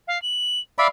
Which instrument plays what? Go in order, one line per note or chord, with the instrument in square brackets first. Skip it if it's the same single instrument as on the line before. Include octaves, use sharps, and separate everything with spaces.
[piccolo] F5
F#7
[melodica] D5 E5 B5 [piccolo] F5